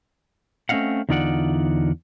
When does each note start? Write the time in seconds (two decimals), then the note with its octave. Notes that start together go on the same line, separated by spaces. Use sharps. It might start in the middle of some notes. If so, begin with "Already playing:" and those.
0.69 A3 C4 C#4 D#5 F5 F#5
1.09 E2 D3 D#4 F4 D5 F#5